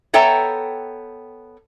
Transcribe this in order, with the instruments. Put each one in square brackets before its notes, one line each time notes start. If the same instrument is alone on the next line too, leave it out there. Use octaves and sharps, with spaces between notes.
[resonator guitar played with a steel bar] B3 A4 C#5 E5 G5 A#5